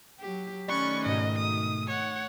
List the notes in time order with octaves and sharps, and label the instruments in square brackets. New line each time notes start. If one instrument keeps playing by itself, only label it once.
[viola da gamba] F#3 G4
[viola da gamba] D#3 A3 [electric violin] C#4 C#6 [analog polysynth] D5 B5 F#6
[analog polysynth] G#2 B2 [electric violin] D#5
[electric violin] D#6
C#5 F#5